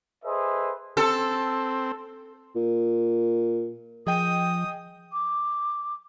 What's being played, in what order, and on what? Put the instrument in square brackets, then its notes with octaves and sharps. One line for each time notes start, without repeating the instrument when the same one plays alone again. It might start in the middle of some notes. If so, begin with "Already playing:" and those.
[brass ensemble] G#4 A4 B4 C5 D#5 E5
[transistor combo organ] C4 [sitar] A4
[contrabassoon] A#2
[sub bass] F3 [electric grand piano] G#4 D#5 G5 [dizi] D#6
[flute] D6